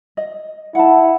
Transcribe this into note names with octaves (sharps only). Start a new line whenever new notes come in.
D#5
E4 F#5 A5